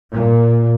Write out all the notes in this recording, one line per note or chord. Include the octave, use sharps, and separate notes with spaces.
A#2